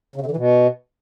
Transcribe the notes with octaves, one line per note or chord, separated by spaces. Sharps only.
C#3
C3
D3
E3
B2